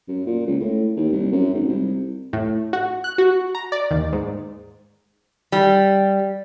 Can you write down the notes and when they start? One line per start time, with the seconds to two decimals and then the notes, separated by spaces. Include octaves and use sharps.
0.08 F#2
0.27 A#2
0.46 C#2
0.60 A2
0.97 D#2
1.12 C2
1.32 F#2
1.54 G#1
1.69 C2
2.33 A2
2.73 F#4
3.04 F#6
3.18 F#4
3.55 A#5
3.72 D5
3.91 D#2
4.13 G#2
5.52 G3